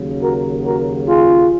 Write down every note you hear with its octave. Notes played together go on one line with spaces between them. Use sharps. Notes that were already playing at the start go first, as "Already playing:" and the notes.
Already playing: D#2 C#3 F#3
F#4 A#4
F#4 A#4
F4 G#4